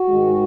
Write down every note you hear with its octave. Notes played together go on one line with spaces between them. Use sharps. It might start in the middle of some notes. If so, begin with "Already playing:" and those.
Already playing: F#4
G#2 D#3 G#3